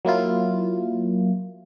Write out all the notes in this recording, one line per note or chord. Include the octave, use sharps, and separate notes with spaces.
F#3 A#3 E4 F4